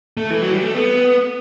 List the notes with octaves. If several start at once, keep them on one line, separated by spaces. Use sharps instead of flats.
A3
E3
F#3
G3
A3
B3